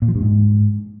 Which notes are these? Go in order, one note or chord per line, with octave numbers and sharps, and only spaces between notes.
A#2
F3
G2
G#2